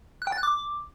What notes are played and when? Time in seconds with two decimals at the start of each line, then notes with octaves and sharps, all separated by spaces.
0.22 F#6
0.27 G5
0.32 A6
0.38 F#6
0.43 D6